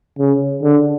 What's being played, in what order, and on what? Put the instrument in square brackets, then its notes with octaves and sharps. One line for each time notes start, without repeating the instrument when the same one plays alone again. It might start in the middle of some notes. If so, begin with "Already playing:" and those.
[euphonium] C#3
D3